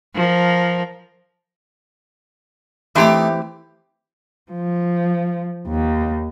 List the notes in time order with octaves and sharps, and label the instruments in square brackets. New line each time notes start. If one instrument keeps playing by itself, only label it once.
[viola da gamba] F3 A#4
[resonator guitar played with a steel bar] E3 C4 G4 [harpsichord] A3 D#4
[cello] F3
D#2